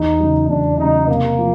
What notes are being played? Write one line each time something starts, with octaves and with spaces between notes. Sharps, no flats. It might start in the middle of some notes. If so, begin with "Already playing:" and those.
Already playing: E2 D#4
C#3 F#3
E2 D4
C#3 F#3 D#4
C3 A#3
F3